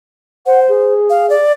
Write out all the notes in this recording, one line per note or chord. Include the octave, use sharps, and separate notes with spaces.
C5 F#5
G#4
F5
D5